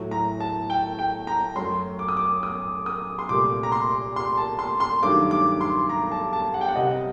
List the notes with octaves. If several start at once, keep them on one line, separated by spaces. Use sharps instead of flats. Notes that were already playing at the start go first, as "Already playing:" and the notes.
Already playing: A2 F#3 A3
A#5
A5
G5
G5
A#5
F#2 F#3 A3 C6
D6
D#6
D6
D#6
D#6
C6
C2 A#2 A3 D6
A#5
C6
C6
A5
C6
C6
G2 D#3 F#3 A3 D6
D6
C6
A#5
A5
A5
F#5
G5
F#5
C2 C3 G3 D#5